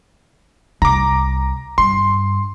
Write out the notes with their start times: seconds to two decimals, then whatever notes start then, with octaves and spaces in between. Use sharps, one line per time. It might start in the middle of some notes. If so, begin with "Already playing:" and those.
0.82 C2 A#5 D6
1.78 G2 C6